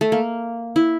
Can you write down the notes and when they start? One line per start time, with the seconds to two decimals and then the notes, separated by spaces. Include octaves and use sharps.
0.01 A3
0.12 A#3
0.76 E4